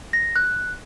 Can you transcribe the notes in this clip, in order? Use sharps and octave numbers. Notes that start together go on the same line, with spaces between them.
A#6
F#6